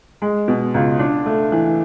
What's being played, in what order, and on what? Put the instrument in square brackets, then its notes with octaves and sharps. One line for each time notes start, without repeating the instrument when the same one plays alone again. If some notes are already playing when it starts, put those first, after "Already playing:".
[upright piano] G#3
B2
C#2
D4
A3
E3